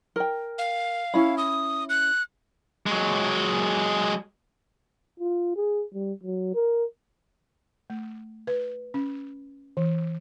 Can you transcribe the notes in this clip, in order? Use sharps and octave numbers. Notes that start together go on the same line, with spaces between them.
A#4 G5
F5
C#4 E4 B5
D#6
F#6
F#3 G#3
F4
G#4
G3
F#3
A#4
A3
B4
C#4
E3